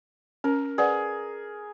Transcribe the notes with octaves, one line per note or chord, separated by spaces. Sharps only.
C#4 A#4
G#4 B4 D5 F#5